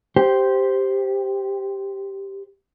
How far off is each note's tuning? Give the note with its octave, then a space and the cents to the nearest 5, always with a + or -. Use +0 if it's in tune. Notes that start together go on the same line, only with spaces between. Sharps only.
G4 +0 C5 +0